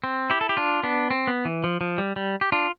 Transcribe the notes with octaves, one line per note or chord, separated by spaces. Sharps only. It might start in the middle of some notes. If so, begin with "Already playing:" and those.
C4
E4 G4
A4
G4
D4 F4
B3 D4
C4
B3
E3
F3
F3
G3
G3
G4
D4 F4